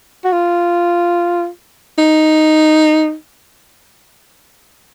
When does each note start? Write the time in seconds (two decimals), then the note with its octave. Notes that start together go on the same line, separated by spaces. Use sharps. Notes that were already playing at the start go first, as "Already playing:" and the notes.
0.25 F#4
0.33 F4
1.98 D#4